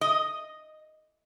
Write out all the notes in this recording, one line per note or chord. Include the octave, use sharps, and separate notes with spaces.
D#5